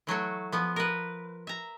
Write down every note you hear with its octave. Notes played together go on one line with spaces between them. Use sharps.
E3 F#3 A3 F#4
F3 B3
A#4 B4
E5 A#5